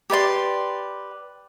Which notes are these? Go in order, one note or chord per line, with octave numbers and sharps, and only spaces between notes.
G4 B4 D5 C6